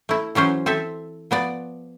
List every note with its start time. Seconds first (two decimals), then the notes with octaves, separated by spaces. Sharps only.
0.09 A3 E4
0.35 E3 F#3 C#4 C5
0.66 C4 A4 E5
1.31 F3 B3 D5